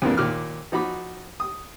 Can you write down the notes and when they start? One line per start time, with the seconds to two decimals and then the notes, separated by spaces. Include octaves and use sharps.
0.02 F2 G#2 C3 E3 A#3 D4
0.17 D#2 A#2 D6 F6
0.72 F3 D#4 F#4 B5 D6
1.40 D#6